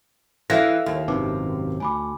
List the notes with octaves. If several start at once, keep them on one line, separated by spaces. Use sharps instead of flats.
E3 A4 E5 F5 A#6
D#2
G#1 F#2 C3 D#4 B4 D6
D2 G#5 B5 D6